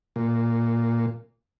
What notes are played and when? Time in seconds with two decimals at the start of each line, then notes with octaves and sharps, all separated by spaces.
0.16 A#2